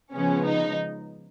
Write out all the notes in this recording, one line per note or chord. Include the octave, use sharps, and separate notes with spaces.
C#3 F3 G#3 B3 C#4
D#4